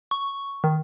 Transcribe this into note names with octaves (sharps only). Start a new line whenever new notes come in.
C#6
D#3